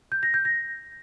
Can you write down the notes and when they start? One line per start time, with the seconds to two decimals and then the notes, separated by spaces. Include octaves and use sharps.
0.12 G6
0.23 A#6
0.34 G6
0.45 A#6